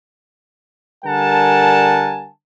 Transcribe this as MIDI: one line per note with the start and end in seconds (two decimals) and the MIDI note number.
1.05 2.29 50
1.05 2.29 55
1.05 2.29 70
1.05 2.29 78
1.05 2.29 80
1.05 2.29 81